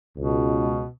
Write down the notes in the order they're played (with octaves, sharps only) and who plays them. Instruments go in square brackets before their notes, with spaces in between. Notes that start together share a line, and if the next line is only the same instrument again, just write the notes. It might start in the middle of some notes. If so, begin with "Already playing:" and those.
[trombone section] C#2 [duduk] B2